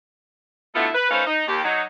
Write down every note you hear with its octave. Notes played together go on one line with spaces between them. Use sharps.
B2 D3 A3 B3 E4 F4
B4
A3 C#4 D#4 B4 C5 F5
D#4
D#2 G4
F#3 D#4